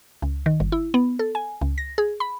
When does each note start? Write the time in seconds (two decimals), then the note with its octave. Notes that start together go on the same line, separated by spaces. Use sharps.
0.22 C#2
0.46 D#3
0.60 G1
0.72 E4
0.94 B3
1.19 A4
1.35 G#5
1.61 C#2
1.78 A#6
1.98 G#4
2.20 B5